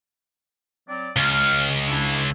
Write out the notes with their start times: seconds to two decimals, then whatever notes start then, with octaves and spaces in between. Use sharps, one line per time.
0.89 F#3 C4 D5
1.17 C#2 F6
1.86 D4 E4